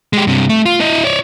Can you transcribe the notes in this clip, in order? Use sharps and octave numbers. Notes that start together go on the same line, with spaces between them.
G#3 G4
G2 C3
A3
F4
E4 D#5
C#5 D5